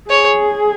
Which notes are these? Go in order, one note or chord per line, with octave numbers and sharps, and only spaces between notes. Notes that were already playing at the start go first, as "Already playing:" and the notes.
G#4 C#5